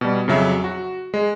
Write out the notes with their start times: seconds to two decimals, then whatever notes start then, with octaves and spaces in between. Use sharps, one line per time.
0.01 B2 G3
0.28 F2 C#3 F#3 E5
0.64 F#4
1.14 G#3